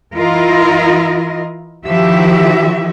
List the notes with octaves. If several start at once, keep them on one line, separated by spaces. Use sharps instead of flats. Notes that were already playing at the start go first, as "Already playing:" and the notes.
E3 E4 F4 A#4 D#5
D#3 F3 E4 F#4 G4 E5